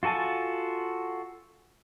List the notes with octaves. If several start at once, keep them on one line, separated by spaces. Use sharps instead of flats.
F4 F#4 A4 G#5 A5